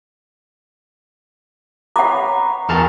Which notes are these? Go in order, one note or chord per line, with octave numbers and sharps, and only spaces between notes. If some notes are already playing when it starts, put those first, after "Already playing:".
B4 C#5 F#5 A#5 D6
E2 G4 G#4 A#4 A5